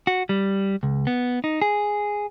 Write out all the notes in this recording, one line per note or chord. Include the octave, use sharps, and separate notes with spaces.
F#4
G3
C#2
B3
D#4
G#4